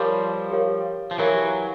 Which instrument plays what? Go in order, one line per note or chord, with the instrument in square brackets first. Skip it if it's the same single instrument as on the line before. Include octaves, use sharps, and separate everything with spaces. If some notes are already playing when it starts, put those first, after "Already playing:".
Already playing: [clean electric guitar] F3 G3 [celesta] G4 A#4 C#5 F5
[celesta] G4 A#4 C#5 F5
[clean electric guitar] F3
[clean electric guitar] E3 F#3 [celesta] G4 A#4 C#5 F5